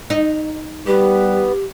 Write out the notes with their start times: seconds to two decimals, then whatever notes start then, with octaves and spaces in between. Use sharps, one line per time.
0.10 D#4
0.87 G3 B3 G4